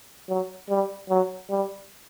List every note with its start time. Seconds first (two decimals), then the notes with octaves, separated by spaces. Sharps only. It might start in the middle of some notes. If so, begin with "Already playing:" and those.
0.28 F#3
0.69 G3
1.09 F#3
1.50 G3